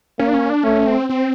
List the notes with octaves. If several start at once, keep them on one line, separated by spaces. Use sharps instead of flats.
A#3 C#4
D4
C#4
D4
A3 C#4
C4
C4